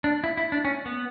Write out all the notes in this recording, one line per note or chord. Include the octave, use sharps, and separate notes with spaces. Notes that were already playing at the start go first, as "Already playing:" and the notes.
D4
E4
E4
D4
C#4
B3